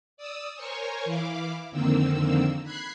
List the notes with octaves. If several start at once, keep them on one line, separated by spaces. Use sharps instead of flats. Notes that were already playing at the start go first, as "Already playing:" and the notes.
D5 D#6 E6
A#4 C5 C#5 G#5 C#6
E3 E4 F5 D6
F2 D3 D#3 A#3 C4 E6
B5 F#6 G#6 C7